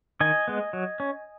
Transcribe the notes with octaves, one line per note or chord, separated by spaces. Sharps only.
D#3 D#5 G#5
G#3 B3
F#3
C#4